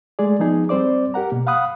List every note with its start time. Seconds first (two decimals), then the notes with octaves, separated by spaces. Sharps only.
0.19 G#3 A3 G#4 D5
0.39 F3 B3 D#4 G#4
0.69 G3 C4 C5 D5 D6
1.14 G4 A#4 F#5 A#5
1.32 B2 A#3
1.47 F5 F#5 B5 D#6 F#6